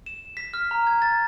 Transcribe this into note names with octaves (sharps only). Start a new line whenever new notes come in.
E7
B6
F6
A#5
G#6
A6